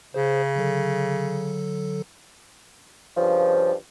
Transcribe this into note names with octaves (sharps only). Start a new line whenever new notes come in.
C#3 G#4 C5
D3 F#3 A4
G2 C#3 F3